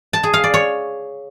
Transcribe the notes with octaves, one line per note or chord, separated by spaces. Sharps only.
A5
G#4
F5
D5
C#5